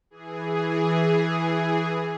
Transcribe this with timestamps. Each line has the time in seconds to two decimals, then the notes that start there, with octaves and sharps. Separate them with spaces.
0.10 E3 G#4